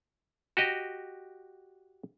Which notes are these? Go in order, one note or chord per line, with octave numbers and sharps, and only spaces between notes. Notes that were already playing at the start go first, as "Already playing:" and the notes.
F#4 G4 D#5